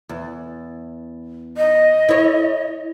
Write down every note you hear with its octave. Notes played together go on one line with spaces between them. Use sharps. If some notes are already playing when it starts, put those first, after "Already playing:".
E2
D#5
E4 C#5